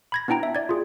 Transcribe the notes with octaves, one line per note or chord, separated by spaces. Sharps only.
B5 G#6 A#6
B3 D4 E4 G5 A#5
E5
D5 G#6
F4 G#4